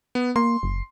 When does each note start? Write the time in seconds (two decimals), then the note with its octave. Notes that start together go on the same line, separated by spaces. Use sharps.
0.15 B3
0.36 A#3 C6
0.63 F#1